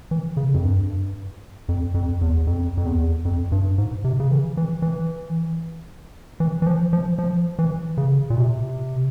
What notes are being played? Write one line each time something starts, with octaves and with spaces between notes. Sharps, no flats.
E3
C#3
F2
G2
F2
F2
E2
F2
F2
E2
F2
G2
G#2
C3
C#3
E3
E3
E3
E3
E3
F3
F3
F3
E3
C#3
A#2
C3